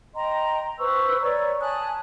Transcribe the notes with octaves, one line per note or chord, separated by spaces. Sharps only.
D#5 G5 A#5 C6
B4 C5 C#6 E6
C#5 D5 A#5 C#6
G#5 A5 D#6 F#6